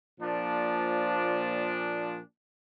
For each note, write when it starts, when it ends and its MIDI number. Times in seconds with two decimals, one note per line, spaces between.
0.21 2.19 46
0.21 2.19 53
0.21 2.19 62